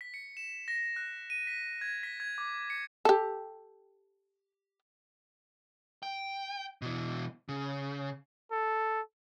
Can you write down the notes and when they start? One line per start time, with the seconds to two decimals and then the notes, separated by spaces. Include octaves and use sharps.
0.01 B6
0.14 C#7
0.37 E7
0.68 A#6
0.96 F#6
1.30 D#7
1.47 B6
1.81 G#6
2.03 B6
2.20 G#6
2.38 D6
2.70 C#7
3.05 G4 A4
6.03 G5
6.82 B2 E3
7.49 C#3
8.51 A4